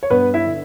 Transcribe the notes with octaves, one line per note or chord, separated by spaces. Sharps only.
C#5
G2 B3 B4
E4 E5
D3